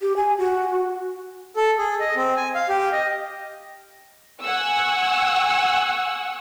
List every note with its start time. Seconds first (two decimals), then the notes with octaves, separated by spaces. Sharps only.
0.01 G4
0.17 G#5
0.38 F#4
1.56 A4
1.78 G#4
2.00 D#5
2.16 C4
2.36 G#5
2.55 F5
2.69 G4
2.93 D#5
4.42 F#5 G#5 C#6 E6